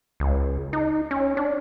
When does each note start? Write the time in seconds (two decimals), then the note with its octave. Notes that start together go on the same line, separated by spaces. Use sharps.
0.20 C#2
0.73 D#4
1.11 C#4
1.37 D4